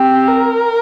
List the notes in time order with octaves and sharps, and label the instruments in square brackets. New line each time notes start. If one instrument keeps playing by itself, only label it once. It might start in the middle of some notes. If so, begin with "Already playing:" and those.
Already playing: [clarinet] C4 [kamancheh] G4
[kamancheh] A#4